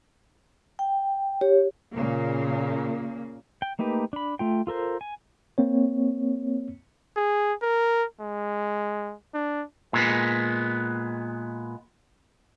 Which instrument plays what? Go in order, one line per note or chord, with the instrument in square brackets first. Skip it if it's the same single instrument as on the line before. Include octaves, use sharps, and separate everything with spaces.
[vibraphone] G5
G4 C#5
[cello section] A#2 C#3 A#3
[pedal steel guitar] G5
A3 A#3 D#4 G4 B4
D4 B5
A3 F4 G5
F4 A4 A#4 C5
G#5
[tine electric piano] A#3 C4 C#5
[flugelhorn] G#4
A#4
G#3
D4
[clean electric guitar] A#2 G#3 B3